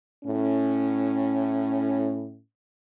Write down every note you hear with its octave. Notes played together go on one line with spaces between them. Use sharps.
A2 C#4